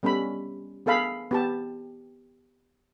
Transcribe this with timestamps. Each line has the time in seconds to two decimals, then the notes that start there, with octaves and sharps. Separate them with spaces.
0.03 G3 B3 C#4 A4 B5
0.86 B3 G#4 A4 F5 B5
1.31 B3 G4 A5